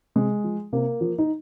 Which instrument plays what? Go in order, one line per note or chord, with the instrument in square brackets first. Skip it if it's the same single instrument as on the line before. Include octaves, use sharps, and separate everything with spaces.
[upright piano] C3 G#3
F3
C3 A#3
F3
D#4